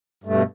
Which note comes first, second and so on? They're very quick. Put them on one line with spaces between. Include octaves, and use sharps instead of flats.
G2 A3 B2